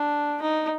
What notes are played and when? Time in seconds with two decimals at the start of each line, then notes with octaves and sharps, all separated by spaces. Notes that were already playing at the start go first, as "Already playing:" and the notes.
Already playing: D4
0.42 D#4